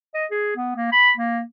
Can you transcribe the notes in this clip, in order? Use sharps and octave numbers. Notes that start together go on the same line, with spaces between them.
D#5
G#4
B3
A#3
B5
A#3